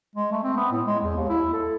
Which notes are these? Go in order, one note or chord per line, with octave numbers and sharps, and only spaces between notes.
G#3
A3
C4
B3
A2
G#3
E2
D#2
E4
A4